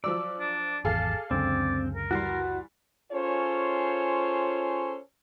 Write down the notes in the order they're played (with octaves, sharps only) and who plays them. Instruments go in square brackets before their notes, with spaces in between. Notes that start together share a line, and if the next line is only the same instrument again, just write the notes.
[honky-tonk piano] F3 F#3 E6 [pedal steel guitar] D5
[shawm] D4
[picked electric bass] G#1 E2 [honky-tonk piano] G#4 A4 F5 [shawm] A5
[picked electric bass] C#2 F#2 D3 [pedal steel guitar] C4 [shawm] D5
[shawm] A#4
[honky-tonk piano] E3 G3 [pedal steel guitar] F#4 C6
[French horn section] C#4 F4 G#4 A4 C5 C#5